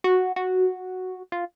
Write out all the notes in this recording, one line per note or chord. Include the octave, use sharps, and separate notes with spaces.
F#4
F#4
F4